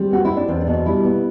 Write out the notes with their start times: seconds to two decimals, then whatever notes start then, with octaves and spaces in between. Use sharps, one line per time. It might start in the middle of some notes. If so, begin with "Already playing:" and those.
Already playing: G3 C4
0.10 B3 F#4
0.25 B2 E4
0.37 D4
0.48 E2 C4
0.61 D4
0.67 B2
0.73 C4
0.85 G3 E4
1.05 B3